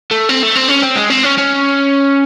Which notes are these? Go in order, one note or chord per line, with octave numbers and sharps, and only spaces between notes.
A3
C4
A3
C4
C#4
C4
G#3
C4
C#4
C#4